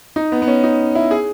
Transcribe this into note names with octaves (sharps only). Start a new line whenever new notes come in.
D#4
B3
B3
C#4
D#4
E4
G#4